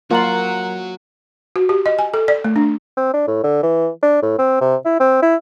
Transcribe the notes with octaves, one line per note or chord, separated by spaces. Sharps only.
F#3 A#3 F4 F#4 A#4 F#5 A#5 F#7
F#4
G4
D#5
G#5
A4
D5
A3
D4
C4
D4
A2
D3
E3
D4
A2
C4
C3
E4
C4
E4